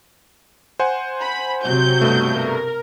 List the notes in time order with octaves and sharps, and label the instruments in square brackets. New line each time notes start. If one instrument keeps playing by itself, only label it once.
[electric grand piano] C5 F#5 G#5
[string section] B5
C3 F#3 G6
[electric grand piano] G2 B2 A3
[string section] A#4